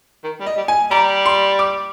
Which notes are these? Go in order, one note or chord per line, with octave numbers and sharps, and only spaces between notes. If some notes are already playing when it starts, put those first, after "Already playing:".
D#3
G3
D#5
G3
G#5
G3 A#5
C6
D6